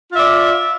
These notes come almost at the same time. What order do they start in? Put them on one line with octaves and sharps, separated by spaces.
F4 E5 D5